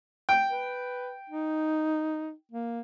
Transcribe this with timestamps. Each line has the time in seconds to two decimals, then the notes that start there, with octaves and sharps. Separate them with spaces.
0.29 G5
0.50 B4
1.30 D#4
2.52 A#3